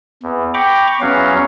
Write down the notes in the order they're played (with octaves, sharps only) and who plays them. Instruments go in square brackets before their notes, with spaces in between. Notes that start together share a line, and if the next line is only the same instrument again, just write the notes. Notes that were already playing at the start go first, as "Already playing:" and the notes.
[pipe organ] E2
G5 A#5 B5 C#6 D6
E2 F#3 C#4 F#4 F5